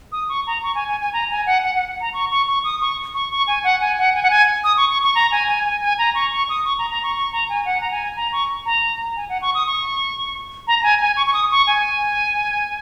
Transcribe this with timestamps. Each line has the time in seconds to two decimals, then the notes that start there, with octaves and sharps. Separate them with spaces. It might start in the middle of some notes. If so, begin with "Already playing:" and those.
0.12 D#6
0.29 C#6
0.47 A#5
0.63 C#6
0.75 G#5
0.88 G#5
1.01 G#5
1.13 A#5
1.30 G#5
1.46 F#5
1.63 F#5
1.75 F#5
2.01 A#5
2.14 C#6
2.31 C#6
2.47 C#6
2.64 D#6
2.81 C#6
3.14 C#6
3.31 C#6
3.47 G#5
3.64 F#5
3.81 G#5
3.98 F#5
4.15 G#5
4.23 F#5
4.30 G#5
4.64 D#6
4.77 C#6
4.89 C#6
5.03 C#6
5.15 A#5
5.32 G#5
5.48 G#5
5.65 G#5
5.82 G#5
5.98 A#5
6.15 C#6
6.32 C#6
6.49 D#6
6.65 C#6
6.78 A#5
6.90 A#5
7.03 C#6
7.16 C#6
7.33 A#5
7.50 G#5
7.65 F#5
7.81 A#5
7.91 G#5
8.16 A#5
8.32 C#6
8.66 A#5
9.16 G#5
9.29 F#5
9.42 C#6
9.55 D#6
9.67 C#6
10.68 A#5
10.79 A#5
10.83 G#5
11.00 G#5
11.17 C#6
11.27 C#6
11.33 D#6
11.51 C#6
11.67 G#5